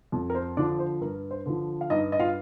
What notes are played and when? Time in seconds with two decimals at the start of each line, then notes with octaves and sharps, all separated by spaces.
0.12 F2
0.30 A#4
0.35 C5
0.57 D3 F3 D4 D5
0.79 C5
1.01 G2 A#4
1.31 C5
1.46 D3 F3
1.81 F5
1.90 G2 D#4 D#5
2.12 D#5
2.20 F4 F5